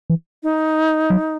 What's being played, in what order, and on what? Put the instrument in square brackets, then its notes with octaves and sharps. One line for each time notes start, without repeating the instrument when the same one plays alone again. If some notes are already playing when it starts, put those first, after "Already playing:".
[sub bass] E3
[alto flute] D#4
[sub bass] F#3